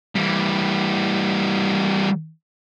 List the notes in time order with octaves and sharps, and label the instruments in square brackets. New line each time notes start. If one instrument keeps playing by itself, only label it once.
[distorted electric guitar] E3 G3